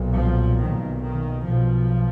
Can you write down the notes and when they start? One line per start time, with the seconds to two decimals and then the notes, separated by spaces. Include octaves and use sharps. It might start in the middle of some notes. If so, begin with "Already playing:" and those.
Already playing: B1 A#2
0.16 F3
0.60 B1 A#2 D#3
1.03 D#3
1.46 B1 B2 F3